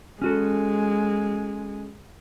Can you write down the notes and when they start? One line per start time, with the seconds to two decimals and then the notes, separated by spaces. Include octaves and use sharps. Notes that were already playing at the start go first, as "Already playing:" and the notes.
0.22 G#3 C#4 F#4 A4